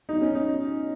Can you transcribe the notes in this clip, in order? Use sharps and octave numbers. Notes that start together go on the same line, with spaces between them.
B2 F#3 D#4
C#4
D#4